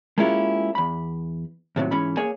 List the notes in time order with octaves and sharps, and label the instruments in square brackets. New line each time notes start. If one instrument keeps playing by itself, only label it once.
[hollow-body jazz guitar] G#3 A#3 C#4 E4 F4 G4
E2 B5
D#2 A2 C3 F#3
G#2 E3 C#4 B5
A#3 G#4 C#5 G#5